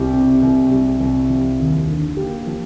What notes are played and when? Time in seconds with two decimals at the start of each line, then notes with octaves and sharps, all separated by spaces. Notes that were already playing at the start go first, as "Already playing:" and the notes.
Already playing: C2 G4
0.13 C3
0.42 C2
0.70 G3
1.00 C2
1.29 F3
1.59 D#2
1.88 D3
2.17 A#3 G4
2.47 F3